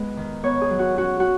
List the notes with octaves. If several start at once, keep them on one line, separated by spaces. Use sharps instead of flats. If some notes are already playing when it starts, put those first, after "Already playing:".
Already playing: G#3 B3 B4
D#3
B3 C#5
G#4
F#3
F#4
C#4 F#4
F#4